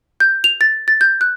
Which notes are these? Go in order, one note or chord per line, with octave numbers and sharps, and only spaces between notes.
G6
F7
A6
A6
G6
F#6